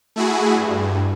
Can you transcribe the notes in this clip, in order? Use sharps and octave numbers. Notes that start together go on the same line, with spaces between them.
A3 E4 F#4 G#4
G2